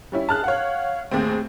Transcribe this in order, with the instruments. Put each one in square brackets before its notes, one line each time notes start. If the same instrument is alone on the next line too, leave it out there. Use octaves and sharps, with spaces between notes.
[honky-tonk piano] G3 C#4 E4
[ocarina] G#4 [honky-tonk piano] A5 F6 F#6
[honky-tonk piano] C#5 F#5 [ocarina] F5
[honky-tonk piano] D#2 A2 C4 [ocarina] G#4